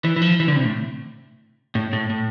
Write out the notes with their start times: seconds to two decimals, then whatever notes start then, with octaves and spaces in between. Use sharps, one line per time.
0.05 E3
0.16 E3
0.22 F3
0.40 E3
0.48 D3
0.56 C3
0.65 A2
1.75 A2
1.93 A2
2.10 A2